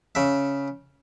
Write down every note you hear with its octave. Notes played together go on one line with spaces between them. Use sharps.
C#3 E5